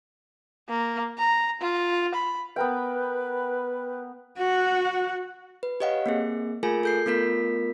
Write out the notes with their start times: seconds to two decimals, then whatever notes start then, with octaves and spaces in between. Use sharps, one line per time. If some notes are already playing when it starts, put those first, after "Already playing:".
0.69 A#3
1.18 A#5
1.61 F4
2.14 B5
2.56 B3 A#4 B4 G5
4.38 F#4 F#5
5.63 B4
5.80 G4 C#5 D#5 F5 F#5
6.06 A#3 C4 G#4
6.63 A3 F4 G#4 A#4 G#5
6.83 A4 G6 C7
7.06 A3 B3 F4 A#4 B6